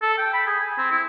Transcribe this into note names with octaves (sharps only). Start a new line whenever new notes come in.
A4
G5
B5
G#4
G#5
C4
E4